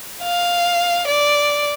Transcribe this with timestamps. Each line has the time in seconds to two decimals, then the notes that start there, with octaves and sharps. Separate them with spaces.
0.23 F5
1.08 D5